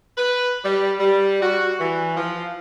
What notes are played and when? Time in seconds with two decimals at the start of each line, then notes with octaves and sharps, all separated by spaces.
0.18 B4
0.65 G3
1.00 G3
1.42 F#4
1.80 E3
2.17 F3